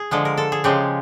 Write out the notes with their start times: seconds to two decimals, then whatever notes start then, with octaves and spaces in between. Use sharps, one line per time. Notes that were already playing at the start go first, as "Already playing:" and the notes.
Already playing: G#4
0.11 D3 F3 G#3
0.25 A#4
0.37 A4
0.52 G#4
0.64 C#3 F3 G#3 G4